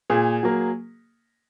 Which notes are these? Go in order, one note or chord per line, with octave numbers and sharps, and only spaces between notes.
A#2 G#4
F#3 A#3